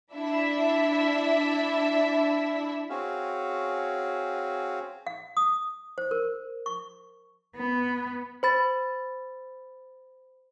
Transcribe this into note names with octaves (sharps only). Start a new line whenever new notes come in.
D4 E4 E5
C4 C#4 F#4 G#4 F5
F5
D#6
C5
A#4
C#6
B3
C5 B5 A6